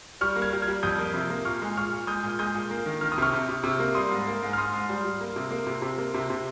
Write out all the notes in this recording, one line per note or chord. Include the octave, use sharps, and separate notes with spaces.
G3 C#6 F6
A#3
F6 G#6
G3
F6 G#6
G3
F2 D#6 G6
A#3
C3
A#3
A#2 C#6 F6
G#3
A#2 C#6 F6
A#2
G#3 D#6 G6
A#2
G#3 D#6 G6
A#2
A#3
D#3
D#3 F6
D#6
C3 C#6 F6
C3
C3
C3
A#3
G3 C6 D#6
G#2
A#3
G#2
F6
G#2 C6 D#6
G#2
G3
G3
A#3
C3
A#3
C3
C3
A#3
C3
C3